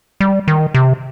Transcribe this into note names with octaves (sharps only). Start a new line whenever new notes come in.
G3
D#3
C3